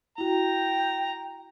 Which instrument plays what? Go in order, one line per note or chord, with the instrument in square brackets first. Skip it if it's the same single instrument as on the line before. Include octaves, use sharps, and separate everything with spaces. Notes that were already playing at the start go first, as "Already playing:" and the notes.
[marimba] E4 F#4 [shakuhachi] G5 [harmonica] A#5